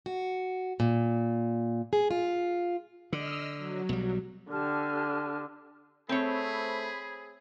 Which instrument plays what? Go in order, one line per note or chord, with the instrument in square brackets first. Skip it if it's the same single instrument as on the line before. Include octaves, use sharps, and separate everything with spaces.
[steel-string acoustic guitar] F#4
A#2
G#4
F4
[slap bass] D3 [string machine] D#5 E6 F6
[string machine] F#3
[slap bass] B1 G3
[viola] D3 [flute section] G4 A5 F6
[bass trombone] A3 [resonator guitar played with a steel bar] C4 C#5 [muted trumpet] G#4 [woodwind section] C5 B5